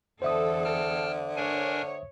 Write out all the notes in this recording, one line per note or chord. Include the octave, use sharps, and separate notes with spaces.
E2 D3 A4 C5 E5 D#6
G5 A5 F6
D4 A#4 C#5 G#5